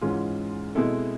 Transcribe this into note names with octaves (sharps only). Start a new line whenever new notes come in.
G#2 E3 G#3 C#4 F4
B2 G#3 C4 E4 A4